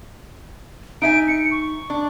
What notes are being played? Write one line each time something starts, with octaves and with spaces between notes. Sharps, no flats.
D#4 E5 G#5 D7
C#7
C#6
D4